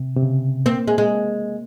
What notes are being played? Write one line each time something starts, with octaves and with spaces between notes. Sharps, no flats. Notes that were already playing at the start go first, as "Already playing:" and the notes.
Already playing: C3
C3
C#3
A#3 C4
G#3
G#3